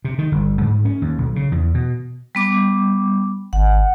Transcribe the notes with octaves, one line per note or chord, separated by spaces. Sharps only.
C3
D#3
G1
G#2
C#4
D#2
B1
C#3
E2
B2
G3 B3 D6
G#1 F#5